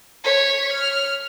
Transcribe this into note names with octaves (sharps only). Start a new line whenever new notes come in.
C#5 B6
F6